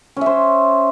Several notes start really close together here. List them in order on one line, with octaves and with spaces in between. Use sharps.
C#4 E5 C5